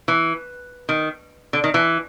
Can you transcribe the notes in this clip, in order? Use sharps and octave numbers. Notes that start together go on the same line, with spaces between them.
E3
D#3
D3
D#3
E3